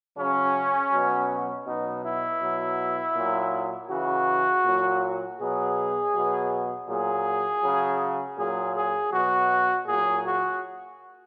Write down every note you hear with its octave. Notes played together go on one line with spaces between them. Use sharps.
C#3 F#3 C#4
B2 F#3
B2 F#3 D#4
E4
B2 F#3
A#2 F#3
C#3 E3 F#4
A#2 F#3
B2 F#3 G#4
B2 F#3
A#2 F#3 G#4
C#3 F#3
A#2 F#3 G#4
G#4
B2 F#3 F#4
A#2 F#3 G#4
F#4